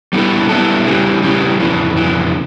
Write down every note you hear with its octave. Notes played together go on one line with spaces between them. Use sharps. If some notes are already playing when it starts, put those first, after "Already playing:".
G3 B3 E4 A4
G3 B3 E4 A4
C#3 E3 G3
C#3 E3 G3
F2 C#3 E3
F2 C#3 E3